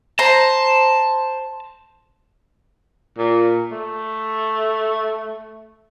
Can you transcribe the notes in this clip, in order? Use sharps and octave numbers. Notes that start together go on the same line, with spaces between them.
C5 A5 A#5
A#2
A3